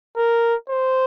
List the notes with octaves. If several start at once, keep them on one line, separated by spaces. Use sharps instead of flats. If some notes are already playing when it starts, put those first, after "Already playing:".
A#4
C5